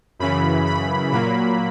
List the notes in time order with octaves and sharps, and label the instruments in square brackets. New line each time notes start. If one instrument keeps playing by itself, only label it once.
[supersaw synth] F#2 C#3 E3 B5
B5
A#2 F#3 A#3 B5